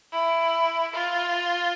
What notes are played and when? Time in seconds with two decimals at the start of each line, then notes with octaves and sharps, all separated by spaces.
0.12 E4
0.94 F4